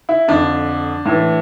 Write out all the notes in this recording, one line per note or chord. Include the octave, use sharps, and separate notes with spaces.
E4
F2 D3 D4
A2 E3